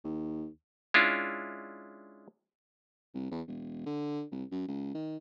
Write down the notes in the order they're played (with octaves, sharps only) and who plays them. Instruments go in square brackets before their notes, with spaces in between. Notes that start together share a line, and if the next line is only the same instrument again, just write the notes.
[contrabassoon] D#2
[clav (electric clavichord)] G#3 C#4 D4 E4 F4
[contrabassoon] C2
E2
E1
D3
C2
F#2
C#2
D#3